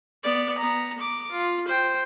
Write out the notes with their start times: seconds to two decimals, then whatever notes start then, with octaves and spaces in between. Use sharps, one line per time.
0.23 B3 D5
0.58 B3 A#5
0.98 B3 D6
1.31 F4
1.68 C5 G5